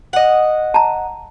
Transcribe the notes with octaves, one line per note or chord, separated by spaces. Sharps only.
D#5 F#5
A5 A#5